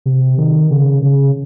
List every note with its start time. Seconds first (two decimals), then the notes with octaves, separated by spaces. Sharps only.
0.06 C3
0.38 D#3
0.71 C#3
1.02 C#3